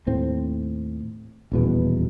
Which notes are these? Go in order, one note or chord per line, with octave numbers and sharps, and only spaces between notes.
D#2 A2 C4
D#1 E2 B2